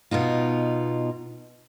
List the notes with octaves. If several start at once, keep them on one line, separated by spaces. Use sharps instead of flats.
B2 B3 D#4 F4